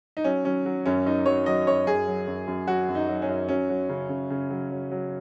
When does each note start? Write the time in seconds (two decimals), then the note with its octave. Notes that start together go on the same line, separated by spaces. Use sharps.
0.17 D#4
0.24 F#3 C#4
0.45 F#3 C#4
0.66 F#3
0.86 F#2 C#4
1.06 F#2 D#4
1.26 F#3 C#5
1.46 F#3 D#5
1.67 F#2 C#5
1.86 F#2 G#4
2.07 F#3
2.27 F#2
2.47 F#2
2.67 F#3 F#4
2.89 F#2
2.95 D#4
3.08 F#3
3.22 C#4
3.29 F#2
3.49 F#3 C#4
3.69 F#3
3.89 C#3
4.09 C#3
4.30 C#3
4.50 F#3
4.71 F#3
4.91 F#3